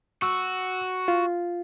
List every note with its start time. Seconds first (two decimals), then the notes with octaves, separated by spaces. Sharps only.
0.22 F#4 C#6 E6
1.08 F4